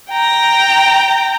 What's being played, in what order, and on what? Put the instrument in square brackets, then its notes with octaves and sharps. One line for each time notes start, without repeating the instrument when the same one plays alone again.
[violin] G5 A#5